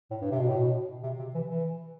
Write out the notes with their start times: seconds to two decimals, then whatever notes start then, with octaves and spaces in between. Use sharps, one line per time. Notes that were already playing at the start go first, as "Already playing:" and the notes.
0.11 A2
0.21 G2
0.31 C3
0.40 B2
0.48 A2
0.57 B2
1.03 C3
1.19 C3
1.35 E3
1.50 E3